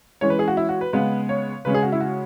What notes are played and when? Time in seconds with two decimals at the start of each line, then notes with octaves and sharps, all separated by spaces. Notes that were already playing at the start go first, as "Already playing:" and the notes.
0.21 E3 G#3 C#4 C#5
0.30 B4
0.39 G#4
0.48 F#4
0.57 E4
0.69 F#4
0.81 B4
0.93 C#3 G#3 B3 B4
1.29 C#5
1.65 C#3 G#3 C#4 B4
1.74 G#4
1.83 F#4
1.92 E4
2.00 F#4